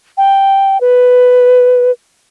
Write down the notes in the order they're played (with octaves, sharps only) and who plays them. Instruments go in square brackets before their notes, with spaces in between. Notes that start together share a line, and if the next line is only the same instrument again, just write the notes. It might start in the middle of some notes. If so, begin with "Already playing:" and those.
[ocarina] G5
B4